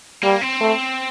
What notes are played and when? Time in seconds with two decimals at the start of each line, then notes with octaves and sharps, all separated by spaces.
0.23 G3 A#3
0.41 C4
0.61 A3